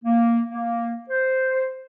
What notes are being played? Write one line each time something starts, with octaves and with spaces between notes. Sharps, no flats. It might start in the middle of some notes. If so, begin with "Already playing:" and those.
A#3
A#3
C5